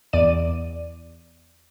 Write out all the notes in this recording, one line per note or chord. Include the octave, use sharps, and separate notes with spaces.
E2 D5 D#7